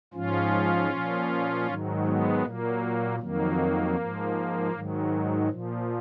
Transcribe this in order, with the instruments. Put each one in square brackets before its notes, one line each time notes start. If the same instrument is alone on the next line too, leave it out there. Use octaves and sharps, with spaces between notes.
[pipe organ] G#2 F3 C#4 F4
A#2 F3
G#2 D#3 F#3
G#3 B3
A#2 F#3 A#3
F2 D#3 F#3 A#3
G#2 F3
G#2 D#3 F#3
A#2 F3